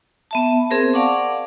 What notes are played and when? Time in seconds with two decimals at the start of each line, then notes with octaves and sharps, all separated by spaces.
0.31 B3 E5 A5
0.70 C4 G#4 A#4 C5
0.94 D5 F5 F#5 A5 C#6 D6